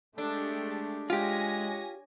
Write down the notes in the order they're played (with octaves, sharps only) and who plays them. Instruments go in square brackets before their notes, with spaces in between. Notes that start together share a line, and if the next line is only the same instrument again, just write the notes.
[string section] G#3 A3 G4 [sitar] D4 [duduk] A4
[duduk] G#3 [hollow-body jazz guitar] F4 G4 [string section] C#5 G#5 A#6